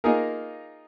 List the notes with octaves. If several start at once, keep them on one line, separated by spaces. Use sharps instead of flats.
A#3 D#4 F4 G#4 A#4